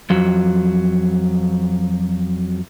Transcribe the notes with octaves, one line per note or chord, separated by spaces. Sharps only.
F2 F#3